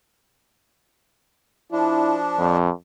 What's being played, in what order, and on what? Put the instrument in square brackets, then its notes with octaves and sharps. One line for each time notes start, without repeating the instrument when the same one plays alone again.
[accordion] F3 D4 [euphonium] E4
[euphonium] F2